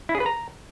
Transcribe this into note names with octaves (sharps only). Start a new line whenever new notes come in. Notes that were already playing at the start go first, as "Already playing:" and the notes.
E4
G#4
B4
A#5